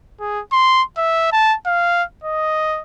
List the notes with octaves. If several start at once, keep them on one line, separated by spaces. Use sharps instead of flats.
G#4
C6
E5
A5
F5
D#5